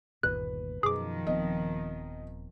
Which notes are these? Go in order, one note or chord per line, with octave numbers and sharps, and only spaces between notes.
G1 D#2 A#2 B4 F#6
F#2 B2 D#3 F3 G#4 D6
D#1 B3 C4 D#5